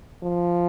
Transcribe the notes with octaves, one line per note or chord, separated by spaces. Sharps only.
F3